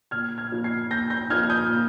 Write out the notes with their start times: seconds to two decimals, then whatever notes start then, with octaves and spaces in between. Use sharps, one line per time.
0.11 A#2 F6 G#6
0.38 F6 G#6
0.51 F3 A#3 D#4
0.64 G#6 C7
0.90 A#2 G6 A#6
1.10 G6 A#6
1.30 F3 A#3 D#4 F6 G#6
1.50 D#6 G6
1.70 A#2